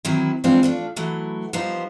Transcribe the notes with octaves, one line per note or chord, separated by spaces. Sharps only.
D#3 E3 F#3 C4 E4
E3 F3 G#3 C4 D4 F4
A3 D4 F4
E3 F#3 A3 E4
F3 G3 B3 D#4 C5